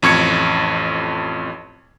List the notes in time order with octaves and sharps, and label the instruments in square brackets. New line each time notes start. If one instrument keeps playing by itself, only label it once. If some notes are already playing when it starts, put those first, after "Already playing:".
[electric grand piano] A1 F2 C#6 G#6 C#7